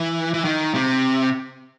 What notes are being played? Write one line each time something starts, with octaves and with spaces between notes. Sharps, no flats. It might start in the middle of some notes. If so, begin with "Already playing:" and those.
Already playing: E3
E3
D#3
C3